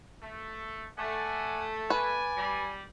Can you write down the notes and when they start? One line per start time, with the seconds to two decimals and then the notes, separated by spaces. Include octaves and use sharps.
0.23 A3
0.98 A3 D5 F#5 G#5
1.90 B4 D5 G#5
2.37 G3